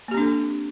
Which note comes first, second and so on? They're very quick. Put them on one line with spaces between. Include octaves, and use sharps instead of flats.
A#3 G4 C4 D4 A4